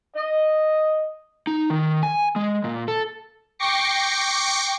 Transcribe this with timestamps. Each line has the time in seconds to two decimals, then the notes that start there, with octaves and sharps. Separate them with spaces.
0.16 D#5
1.47 D#4
1.70 D#3
2.03 G#5
2.36 G#3
2.64 A#2
2.88 A4
3.59 G5 C#6 D6 A#6 C7 C#7